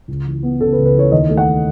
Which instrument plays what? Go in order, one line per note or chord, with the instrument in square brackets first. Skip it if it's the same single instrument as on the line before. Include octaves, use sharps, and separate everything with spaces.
[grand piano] C#2
E3
B3
C#3 A4
B4
C#2
B4
E3 C#5
D#2 D#5
A3
F#5